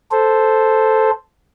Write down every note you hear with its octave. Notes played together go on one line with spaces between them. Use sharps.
A4 C5